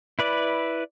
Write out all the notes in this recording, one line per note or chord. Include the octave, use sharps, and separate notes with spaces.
E4 B4 D5